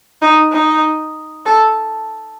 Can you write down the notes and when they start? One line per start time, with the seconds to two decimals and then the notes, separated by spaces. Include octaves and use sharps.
0.22 D#4
0.52 D#4
1.46 A4